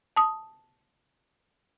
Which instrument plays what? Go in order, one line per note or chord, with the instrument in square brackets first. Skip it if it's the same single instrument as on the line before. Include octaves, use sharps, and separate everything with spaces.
[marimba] A5 D#6